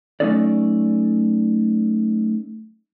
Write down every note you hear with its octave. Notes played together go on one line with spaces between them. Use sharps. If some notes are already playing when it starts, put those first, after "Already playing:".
F#3 A3 C#4 D#4 A4 D5